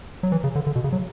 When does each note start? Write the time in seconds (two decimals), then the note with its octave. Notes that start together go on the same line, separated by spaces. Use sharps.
0.23 F#3
0.32 E3
0.44 C#3
0.55 D3
0.67 D3
0.76 B2
0.84 C#3
0.93 F#3